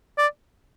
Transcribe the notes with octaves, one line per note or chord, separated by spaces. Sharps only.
D5